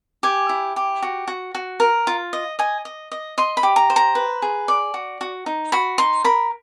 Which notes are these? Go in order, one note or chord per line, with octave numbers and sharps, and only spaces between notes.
G4 G#5
E4
G4
F#4
F#4
F#4
A#4
F4
D#5
D#5 G#5
D#5
D#5
D#5 C6
B5
G4
A#5
C5
A#5
B4
G#4
D5
F#4
F#4
D#4
F#4 B5
D#4 C6
A#4 B5